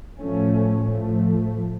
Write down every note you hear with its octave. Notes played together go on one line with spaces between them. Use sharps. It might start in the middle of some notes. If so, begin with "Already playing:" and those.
A2 F3 A3 C#4
A2 F3 A3